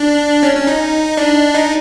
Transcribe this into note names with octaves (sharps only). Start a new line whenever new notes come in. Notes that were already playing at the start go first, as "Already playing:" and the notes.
Already playing: D4
C#4
C#4
D#4
D4
D#4